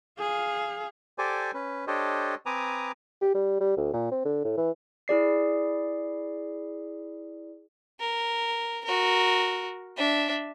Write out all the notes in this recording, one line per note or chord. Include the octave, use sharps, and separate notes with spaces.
G#4 F5
G4 A4 C5 D5 G#5
C#4 B4
D4 G4 A4 C5 C#5 D#5
C4 B4 G#5 A#5 D6 D#6
G4
G3
G3
D2
A#2
C4
D3
A2
E3
E4 G#4 D5 C7
A#4
F#4 A#4
D4 E5